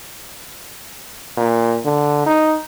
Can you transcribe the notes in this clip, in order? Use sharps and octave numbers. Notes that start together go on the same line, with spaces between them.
A#2
D3
D#4